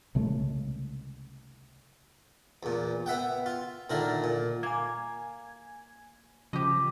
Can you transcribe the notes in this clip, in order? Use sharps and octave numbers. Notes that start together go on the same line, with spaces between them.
C2 C#3 G#3 A3
E2 A#2
B3 E5 F#5 G5
F4
A#2 D3 D#3 E4 A#4
A#2
A#3 G#5 G#6
C#3 F3 G4 D#5